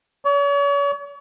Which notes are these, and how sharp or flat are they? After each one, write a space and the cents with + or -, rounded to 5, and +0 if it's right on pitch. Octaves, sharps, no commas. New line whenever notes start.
C#5 +40